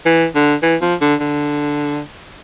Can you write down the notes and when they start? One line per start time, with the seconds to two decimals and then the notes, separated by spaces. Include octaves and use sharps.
0.06 E3
0.35 D3
0.63 E3
0.81 F3
1.01 D3
1.20 D3